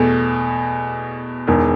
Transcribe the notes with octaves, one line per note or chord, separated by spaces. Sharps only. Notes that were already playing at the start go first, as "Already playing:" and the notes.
Already playing: E2 B2 A3
E1 E2 D#3